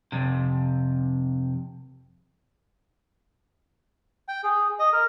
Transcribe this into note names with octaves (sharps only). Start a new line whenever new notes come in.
F2 C3
G5
G#4
D#5
A#4